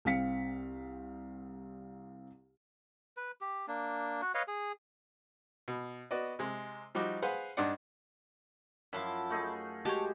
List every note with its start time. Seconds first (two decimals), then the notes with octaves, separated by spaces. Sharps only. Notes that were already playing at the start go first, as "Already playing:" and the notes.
0.05 C2 C4 F5 B6 C#7
3.17 B4
3.41 G4
3.68 A#3 D4
4.22 F#4
4.35 B4 C#5 D#5 F5
4.48 G#4
5.68 B2
6.11 B3 F#4 D5 D#5
6.39 C3 G#3
6.95 F3 G3 D#4 F#4 D6
7.22 G#4 B4 C5 F5 F#5
7.57 G2 D4 D#4 D5 F#5
8.93 F#2 F3 E4 A4 C6
9.30 A3 D#4 G#4
9.85 G#3 F#4 G4 A4 C#5